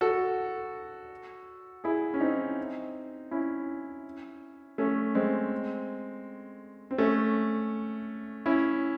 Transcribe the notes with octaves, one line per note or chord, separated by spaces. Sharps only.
F#4 A4
E4 G#4
C#4
C4 D#4
C#4 E4
A3 C#4
G#3 C4
C4
A3 C#4
C#4 E4